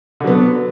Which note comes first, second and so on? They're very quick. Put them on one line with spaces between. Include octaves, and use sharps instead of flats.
D3 F#3 B3